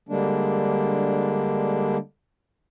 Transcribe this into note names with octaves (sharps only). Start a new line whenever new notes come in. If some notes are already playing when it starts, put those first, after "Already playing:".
D3 G3 G#3 A#3 D4